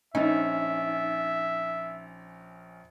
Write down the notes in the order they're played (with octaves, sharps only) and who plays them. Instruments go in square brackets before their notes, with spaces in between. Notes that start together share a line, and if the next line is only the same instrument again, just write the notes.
[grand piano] A#1 C#4 [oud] D#4 [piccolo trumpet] E5